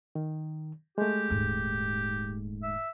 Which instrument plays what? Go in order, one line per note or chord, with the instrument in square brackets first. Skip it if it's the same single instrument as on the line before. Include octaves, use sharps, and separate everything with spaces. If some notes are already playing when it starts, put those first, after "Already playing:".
[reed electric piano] D#3
[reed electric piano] G#3 A3 [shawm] G4
[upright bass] D#1 G#2
[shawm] E5